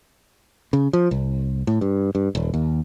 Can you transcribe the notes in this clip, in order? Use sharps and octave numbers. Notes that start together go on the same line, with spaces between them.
C#3
F3
C2
A2
G2
G2
D#1
D#2